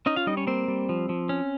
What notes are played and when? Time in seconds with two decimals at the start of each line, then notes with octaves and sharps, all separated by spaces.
0.06 C#4 D#4 D#5
0.16 F4 F5
0.27 G3 D#4 D#5
0.37 C#4 C#5
0.47 A#3 C4 C5
0.68 G3
0.89 F3
1.09 F3
1.29 C#4